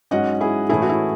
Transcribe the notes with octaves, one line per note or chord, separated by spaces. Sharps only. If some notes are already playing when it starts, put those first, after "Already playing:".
G#2 F#3 C#4 D#5 F#5
E4 G#4
A2 E3 A3 C#4 E4 G#4
F#4
E4